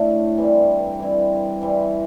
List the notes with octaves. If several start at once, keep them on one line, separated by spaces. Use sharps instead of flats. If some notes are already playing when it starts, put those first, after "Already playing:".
Already playing: A2 A3 D4
G2 E3 G3 C4
E3 G3 C4 E4
E3 G3 C4